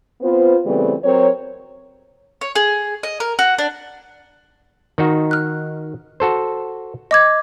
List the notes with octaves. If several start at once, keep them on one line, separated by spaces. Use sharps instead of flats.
B3 C4 F4 B4 C5
C#3 E3 G3 A3 B3 C4
F#3 C4 A#4 C#5
C#5
G#4
D#5
A#4
F#4
D4
D#3 D#4 F#4
F6 F#6
F#4 A4 C5
D#5 D6 G#6